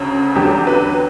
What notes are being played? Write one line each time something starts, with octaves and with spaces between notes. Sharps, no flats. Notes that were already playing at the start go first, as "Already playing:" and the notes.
Already playing: D2 C#3 F#3
E2 D3 F#3 G4
B4